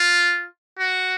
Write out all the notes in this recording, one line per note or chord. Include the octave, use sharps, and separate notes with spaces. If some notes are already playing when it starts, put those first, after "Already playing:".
Already playing: F4
F#4